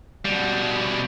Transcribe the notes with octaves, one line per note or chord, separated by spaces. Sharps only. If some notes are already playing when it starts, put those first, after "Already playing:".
B2 G3